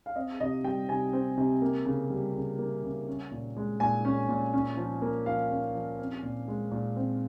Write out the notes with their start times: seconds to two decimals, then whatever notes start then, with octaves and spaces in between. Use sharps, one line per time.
0.06 F5
0.16 C4 D#5
0.40 C3 D#5
0.64 G3 G5
0.89 C3 G#5
1.13 C4
1.37 C3
1.62 A#3
1.85 C#3
2.10 G3
2.34 C#3
2.59 A#3
2.83 C#3
3.07 C#4
3.31 A#2
3.57 G#3
3.80 A#2 G#5
4.05 C#4
4.29 A#2
4.54 C#4
4.77 F3
5.02 A#3
5.26 F3 F5
5.51 C#4
5.75 F3
5.99 C4
6.23 A#2
6.48 G#3
6.71 A#2
6.96 C4